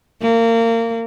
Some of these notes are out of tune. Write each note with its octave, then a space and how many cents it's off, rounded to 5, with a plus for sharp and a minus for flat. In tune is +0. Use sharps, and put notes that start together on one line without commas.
A#3 -25